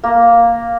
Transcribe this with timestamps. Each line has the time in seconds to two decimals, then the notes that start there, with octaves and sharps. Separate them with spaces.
0.04 A#3